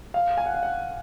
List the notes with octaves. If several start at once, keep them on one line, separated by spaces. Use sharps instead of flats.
F5
G#5
F#5
F5
F#5